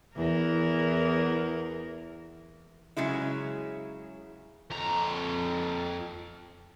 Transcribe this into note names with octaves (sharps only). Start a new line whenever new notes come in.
E2 E3 A#4
C#3 F#3 G#3 E4
F2 A#5